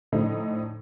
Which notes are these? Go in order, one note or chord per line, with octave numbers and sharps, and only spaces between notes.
A2 D3 F3 A3 D#4